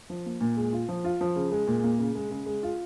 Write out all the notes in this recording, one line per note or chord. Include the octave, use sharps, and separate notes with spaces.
F3
A#3
A#2
G#3
F4
F3
F4
F3
C#3
G#3
A#2
A#3
C#3
G#3
C#3
G#3
F4